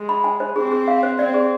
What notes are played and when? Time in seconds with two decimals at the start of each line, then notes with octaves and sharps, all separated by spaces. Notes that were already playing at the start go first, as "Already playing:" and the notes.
Already playing: G#3
0.09 B5
0.24 G#5
0.40 C5
0.56 C4 G#4
0.72 G#4
0.88 F5
1.03 C5
1.18 C4 D5
1.34 G#4